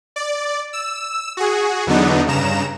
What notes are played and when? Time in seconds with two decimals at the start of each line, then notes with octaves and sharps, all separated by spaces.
0.16 D5
0.73 E6
1.37 F#4 G#4
1.87 E2 D3 F#3 B3 D4 D#4
2.27 G2 C#3 A#5 E7